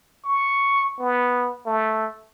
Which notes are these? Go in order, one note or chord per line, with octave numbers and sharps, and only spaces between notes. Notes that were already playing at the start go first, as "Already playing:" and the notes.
C#6
B3
A3